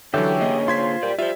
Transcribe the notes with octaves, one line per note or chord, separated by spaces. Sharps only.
D3 E3 F#3 C#4 G4 A4 E5 G5
D3 A#3 G#4 D#5
F4 C5 C6 G#6 B6
A#2 G4 D5
G3 F4 C5 E5